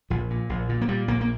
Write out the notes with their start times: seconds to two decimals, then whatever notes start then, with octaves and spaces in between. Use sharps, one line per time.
0.10 A#1 F3
0.30 A#2
0.49 A#1
0.69 A#2
0.81 A#3
0.88 A#2 G3
1.08 A#1 A#3
1.21 A#3